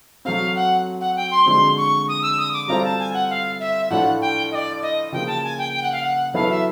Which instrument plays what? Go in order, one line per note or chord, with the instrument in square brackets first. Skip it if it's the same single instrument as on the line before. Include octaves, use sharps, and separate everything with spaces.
[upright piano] F#3 A3 C4 [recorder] F5
[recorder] F#5
F#5
G5
C6
[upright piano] D3 F3 G#3 C4 [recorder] C6
[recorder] C#6
D#6
E6
D#6
D6
[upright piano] G3 C4 F4 A4 C5 [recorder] A#5
[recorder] A5
G#5
F#5
F5
E5
[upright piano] A2 F3 A3 D4 F4 [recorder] F#5
[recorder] G5
D#5
D5
D#5
[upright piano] C#3 F3 A#3 [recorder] G5
[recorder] A5
G#5
G5
G5
F#5
F5
F#5
[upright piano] F#3 B3 E4 A4 [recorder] F5
[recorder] E5